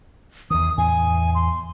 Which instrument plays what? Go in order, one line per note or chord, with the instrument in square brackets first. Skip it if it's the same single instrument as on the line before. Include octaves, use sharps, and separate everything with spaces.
[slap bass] E2 D#3 [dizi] D#6
[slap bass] E2 A2 [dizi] G#5
[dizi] C6